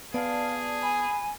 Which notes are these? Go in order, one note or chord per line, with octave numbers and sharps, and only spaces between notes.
B3 G#4 D5 F5 A5
G#5 B5